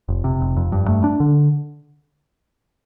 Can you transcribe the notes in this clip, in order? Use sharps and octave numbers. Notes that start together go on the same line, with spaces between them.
F1
C3
F1
F2
G2
A3
D4
D3